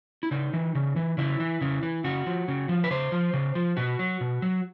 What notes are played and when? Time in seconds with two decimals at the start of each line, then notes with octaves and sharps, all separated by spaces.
0.23 E4
0.31 C#3 D#4
0.53 E3
0.75 C#3
0.96 E3
1.18 C#3 E4
1.40 E3
1.61 C#3
1.83 E3
2.04 C#3 F#4
2.26 F3
2.48 C#3
2.69 F3
2.84 B4
2.91 C#3 C5
3.12 F3
3.33 C#3
3.55 F3
3.77 B2 F#4
3.99 F#3
4.21 B2
4.42 F#3